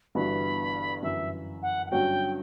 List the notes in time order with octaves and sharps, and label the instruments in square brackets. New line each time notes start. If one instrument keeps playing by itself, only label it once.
[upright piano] G1 G2 E3 B3 F#4 [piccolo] B5
[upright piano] G1 F#2 E3 [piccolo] E5
[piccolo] F#5
F#5
[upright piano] G1 G2 F#3 C#4 F#4 [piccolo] G5